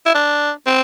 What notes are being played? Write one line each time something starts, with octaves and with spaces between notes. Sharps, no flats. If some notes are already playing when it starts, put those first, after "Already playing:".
E4
D4
C4